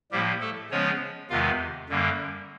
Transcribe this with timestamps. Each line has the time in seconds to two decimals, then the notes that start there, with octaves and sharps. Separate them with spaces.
0.11 A2 F3 G3 A#3 G4
0.41 A3 A4
0.70 C#3 F3 G#3 B3 C#4 C#5
1.30 E2 C3 D#3 G#3 B3 F4 F5
1.89 F#2 D3 G3 A#3